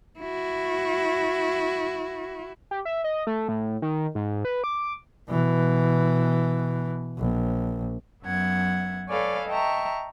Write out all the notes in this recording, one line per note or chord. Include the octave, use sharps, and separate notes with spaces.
E4 F#4
G4
E5
D#5
A3
A2
D#3
G#2
B4
D6
B2 E3
A#1
F#2 B3 E5 F#5 G#6
A4 B4 C#5 D5 F5 G#5
D#5 E5 G5 A5 A#5 C#6